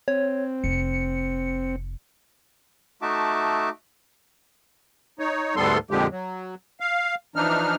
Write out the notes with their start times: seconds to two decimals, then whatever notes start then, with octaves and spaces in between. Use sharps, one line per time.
0.08 C4 C#5
0.64 F1 C#7
3.02 A3 D#4 F#4 E5 A5 D6
5.19 D#4 C#5
5.56 D2 G#2 G3 B3 A4 C6
5.91 F2 A#2 D3 F3 G#3 G4
6.11 F#3
6.80 F5
7.36 E3 F3 D4 D#4 F6